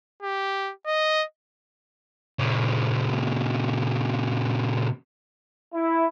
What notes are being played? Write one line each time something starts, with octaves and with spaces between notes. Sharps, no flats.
G4
D#5
A#2 C#3
E4